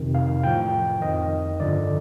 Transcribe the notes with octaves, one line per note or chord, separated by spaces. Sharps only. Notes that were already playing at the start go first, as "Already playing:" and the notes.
Already playing: F2 C3 D#3
F5
A2 F3 G5
F2 D#3 D#5
G2 D3 F3 D5